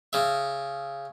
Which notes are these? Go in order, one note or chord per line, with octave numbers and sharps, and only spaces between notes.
C#3 E5